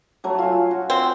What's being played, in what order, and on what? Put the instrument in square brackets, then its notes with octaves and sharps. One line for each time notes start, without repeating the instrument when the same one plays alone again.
[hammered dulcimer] F#3 A3
F4 G#5
F#4
[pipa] C4